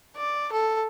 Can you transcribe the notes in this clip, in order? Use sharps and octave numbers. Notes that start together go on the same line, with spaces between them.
D5
A4